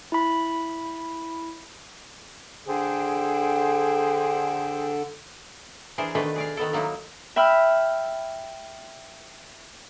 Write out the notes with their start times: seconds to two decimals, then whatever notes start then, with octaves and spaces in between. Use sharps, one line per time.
0.12 E4 B5
2.66 D3 G#4 C5 G5
5.98 E3 D4 G#4 A#4 C5
6.15 B2 D#3 A3 D4 B4 C5
6.36 G#4 D5 F5
6.57 D#3 B3 A4
6.73 F#3 A#3 D#4 E4
7.36 E5 G5 B5 E6 F6